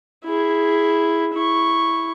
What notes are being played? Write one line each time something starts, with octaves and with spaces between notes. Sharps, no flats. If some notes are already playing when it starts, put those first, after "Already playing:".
E4 G#4
E4 C#6